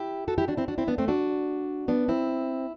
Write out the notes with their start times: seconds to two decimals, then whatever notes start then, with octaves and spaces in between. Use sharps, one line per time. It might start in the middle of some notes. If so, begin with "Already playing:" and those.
Already playing: E4 G4
0.28 F#4 A4
0.38 E4 G4
0.48 D4 F#4
0.57 C4 E4
0.68 D4 F#4
0.78 C4 E4
0.88 B3 D4
0.98 A3 C4
1.08 D4 F#4
1.88 B3 D4
2.08 C4 E4